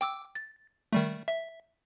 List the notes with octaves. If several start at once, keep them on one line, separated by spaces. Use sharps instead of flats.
G5 D6 E6
A6
D#3 G3 A3
E5